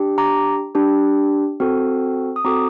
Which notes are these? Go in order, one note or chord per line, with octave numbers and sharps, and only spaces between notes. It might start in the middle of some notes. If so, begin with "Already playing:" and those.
Already playing: D4 G4
A#5 D6
D4 G4
C4 F#4 A4
D#6
C4 F#4 A4 A#5 D6